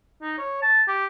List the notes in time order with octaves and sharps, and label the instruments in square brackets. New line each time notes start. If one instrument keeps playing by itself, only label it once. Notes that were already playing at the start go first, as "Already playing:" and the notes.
[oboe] D#4
C#5
A5
G4